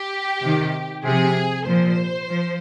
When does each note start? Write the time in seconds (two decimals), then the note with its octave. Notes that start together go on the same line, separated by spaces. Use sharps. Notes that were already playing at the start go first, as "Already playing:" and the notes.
Already playing: G4
0.41 C3 D#3
1.04 C3 F3 G#4
1.66 A#2 F3 C5
2.29 F3